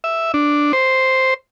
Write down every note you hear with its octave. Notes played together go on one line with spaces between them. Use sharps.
E5
D4
C5